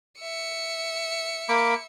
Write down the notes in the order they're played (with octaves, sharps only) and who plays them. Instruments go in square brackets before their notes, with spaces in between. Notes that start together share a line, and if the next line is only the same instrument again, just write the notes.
[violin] E5 C#7
[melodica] A#3 B5 D6